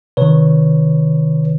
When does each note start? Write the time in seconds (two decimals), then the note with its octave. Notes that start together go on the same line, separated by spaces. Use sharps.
0.17 C3 D#3 B4 C#5